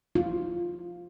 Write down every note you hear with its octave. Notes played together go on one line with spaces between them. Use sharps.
F4